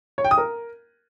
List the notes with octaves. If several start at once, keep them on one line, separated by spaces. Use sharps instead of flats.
C#5
G5
D#6
A#4